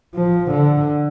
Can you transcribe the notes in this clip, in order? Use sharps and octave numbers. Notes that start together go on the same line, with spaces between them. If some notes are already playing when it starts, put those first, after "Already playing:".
F3
D3